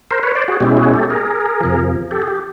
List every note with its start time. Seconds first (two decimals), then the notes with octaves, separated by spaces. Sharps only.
0.11 A#4 C5
0.23 B4 C#5
0.35 C5 D5
0.48 F#4 G#4
0.60 B2 G#3 C#4 E4 G4
0.77 F#4 G#4
0.94 G4 A4
1.10 G#4 A#4
1.60 F2 C3 F3
2.11 G4 A4
2.22 G#4
2.28 G4